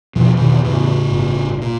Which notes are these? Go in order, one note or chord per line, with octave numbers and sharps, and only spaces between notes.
E2 B2 F3 G3
B2 D#3 E3
A2 C#3
G1
A#2